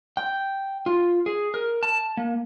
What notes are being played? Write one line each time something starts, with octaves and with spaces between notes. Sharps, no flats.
G5
F4
G#4
A#4
A5
A#3